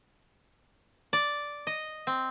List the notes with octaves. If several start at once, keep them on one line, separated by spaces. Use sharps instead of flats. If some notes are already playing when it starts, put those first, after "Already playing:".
D5
D#5
C4